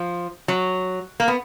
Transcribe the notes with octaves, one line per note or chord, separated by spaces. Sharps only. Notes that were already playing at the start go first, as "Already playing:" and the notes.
Already playing: F3
F#3
A#3
B3